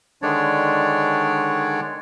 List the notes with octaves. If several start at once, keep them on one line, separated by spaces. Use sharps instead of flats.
D3 D#3 G#3 D4 C#5 D5